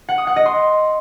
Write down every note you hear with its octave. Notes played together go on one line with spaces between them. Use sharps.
F#5
D#6
F#5
D#5
C6